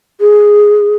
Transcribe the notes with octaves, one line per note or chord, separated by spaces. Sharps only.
G#4